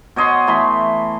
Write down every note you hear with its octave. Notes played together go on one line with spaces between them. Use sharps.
B2 C#5 D#5 C6
E3 A3 B5 C6